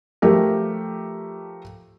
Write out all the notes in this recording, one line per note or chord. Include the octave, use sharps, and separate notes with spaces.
F3 A3 G4 A#4